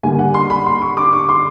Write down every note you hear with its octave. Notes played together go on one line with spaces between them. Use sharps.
D3 G3 A#3 G#5
F#5
C6
B5
C6
C#6
D6
C#6
C6